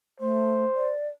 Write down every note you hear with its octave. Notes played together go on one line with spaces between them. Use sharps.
A3 C5
D5